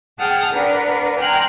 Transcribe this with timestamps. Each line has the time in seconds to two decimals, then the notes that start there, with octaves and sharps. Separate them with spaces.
0.18 G#4 F#5 G5 A5 D#6 F6
0.53 D4 A#4 B4 F#5
1.19 G5 G#5 A#5 C6 F6 F#6